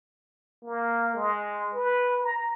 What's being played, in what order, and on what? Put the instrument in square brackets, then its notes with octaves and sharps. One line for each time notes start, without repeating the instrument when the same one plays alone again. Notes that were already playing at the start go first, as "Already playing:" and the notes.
[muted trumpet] A#3
G#3
B4
A#5